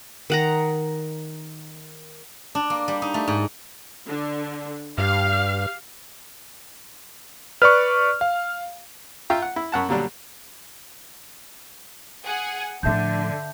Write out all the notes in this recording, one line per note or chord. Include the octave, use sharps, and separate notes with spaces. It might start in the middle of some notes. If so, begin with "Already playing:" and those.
D#3 F#5 A#5
D4
A#3
G3
D#4
A3
G#2
D3
G2 G4 F5
B4 D5 C#6 F6
F5
F4 E5 G5 A#5
F#5
E4
F#2 F#5 A5
A#2 D3 F#3 G3 D4
G#4 F#5 G#5
A2 D3 F3 E5 A5 G6